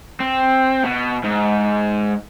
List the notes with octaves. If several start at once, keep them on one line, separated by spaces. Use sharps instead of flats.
C4
B2
G#2